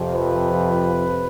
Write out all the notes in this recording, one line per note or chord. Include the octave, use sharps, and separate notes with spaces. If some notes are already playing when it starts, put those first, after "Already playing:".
Already playing: F2 C3 F3
B4